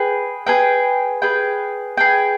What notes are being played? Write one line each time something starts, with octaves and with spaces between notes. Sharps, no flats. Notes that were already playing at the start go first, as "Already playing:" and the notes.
Already playing: G#4 B4 G5
G#4 B4 G5
G#4 B4 G5
G#4 B4 G5